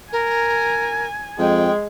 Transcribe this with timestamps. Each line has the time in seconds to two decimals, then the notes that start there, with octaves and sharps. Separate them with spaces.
0.13 A#4 G#5
1.39 F2 G#3 G5